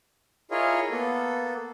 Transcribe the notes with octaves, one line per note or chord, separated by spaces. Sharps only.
E4 F4 G#4 A#4 C#5 D#5
A#3 B3 A4